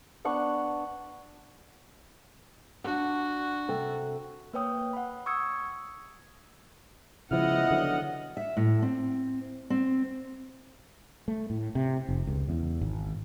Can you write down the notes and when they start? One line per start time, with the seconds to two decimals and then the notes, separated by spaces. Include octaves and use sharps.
0.25 B3 D4 F#5 C#6
2.84 D4 F#4 F#5
3.68 C3 A4 G5
4.53 A#3 B4 C#5 G5 D#6
4.93 F#5 B5
5.26 C#6 D#6 E6 G#6 C#7
7.31 C#3 F3 G#3 B3 E4 D#5 F#5 F6
7.71 D3 F#3
8.37 E5
8.57 A2
8.82 C4
9.70 C4
11.28 A3
11.50 A2
11.75 C3
12.09 F1
12.27 C#2
12.49 E2
12.81 G#1